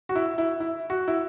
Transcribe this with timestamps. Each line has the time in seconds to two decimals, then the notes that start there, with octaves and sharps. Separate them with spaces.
0.09 F#4
0.15 E4
0.38 E4
0.60 E4
0.90 F#4
1.08 E4